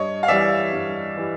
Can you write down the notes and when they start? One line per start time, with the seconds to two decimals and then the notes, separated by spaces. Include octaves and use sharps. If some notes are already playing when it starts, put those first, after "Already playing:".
Already playing: G2 C#5 D#5
0.23 F5
0.28 E3 G3 D5 E5
0.72 G2
1.17 E3 G3